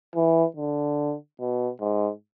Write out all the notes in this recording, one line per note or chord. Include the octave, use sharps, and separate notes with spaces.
E3
D3
B2
G#2